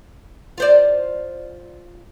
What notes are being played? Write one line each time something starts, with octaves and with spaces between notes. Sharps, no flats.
F4 C5 D5